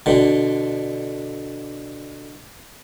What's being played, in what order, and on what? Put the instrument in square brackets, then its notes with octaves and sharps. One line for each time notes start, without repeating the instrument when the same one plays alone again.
[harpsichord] B2 D3